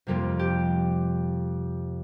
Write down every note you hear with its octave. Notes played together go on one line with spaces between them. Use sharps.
F2 C3 G3 A#3 F4
G4